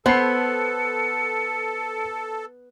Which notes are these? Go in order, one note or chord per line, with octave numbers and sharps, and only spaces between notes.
B3 A4 C5 B5 C7 C#7